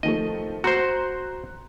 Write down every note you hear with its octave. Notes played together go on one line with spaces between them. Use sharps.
D#3 F3 A3 D#5
F#4 C5 A#5 C6 F#6